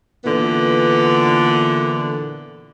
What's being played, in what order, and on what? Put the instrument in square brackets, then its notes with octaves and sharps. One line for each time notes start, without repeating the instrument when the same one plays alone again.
[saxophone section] A#2 D3 E3 B3